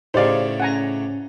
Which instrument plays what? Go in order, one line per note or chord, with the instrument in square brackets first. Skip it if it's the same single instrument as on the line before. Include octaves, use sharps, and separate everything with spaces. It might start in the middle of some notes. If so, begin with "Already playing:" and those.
[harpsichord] A2 C#3 [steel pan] D#4 G4 F5 [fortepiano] C5 D5
[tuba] C#4 [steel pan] F#5 G#5 A#5